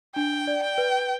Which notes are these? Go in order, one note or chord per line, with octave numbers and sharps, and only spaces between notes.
D4 G5
D5
G5
B4